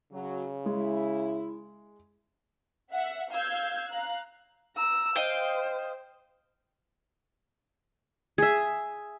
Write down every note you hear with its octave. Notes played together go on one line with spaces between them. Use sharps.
C#3 F#3
G#3 E4
E5 F#5
F5 E6 G6 G#6
F5 A#5 F#6
A#5 E6
C5 D#5 F5 G5
G#4 E5